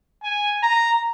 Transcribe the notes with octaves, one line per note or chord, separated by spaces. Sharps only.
G#5
A#5